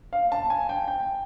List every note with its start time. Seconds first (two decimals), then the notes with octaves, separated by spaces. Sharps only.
0.13 F5
0.32 A5
0.50 G#5
0.69 G5
0.88 G5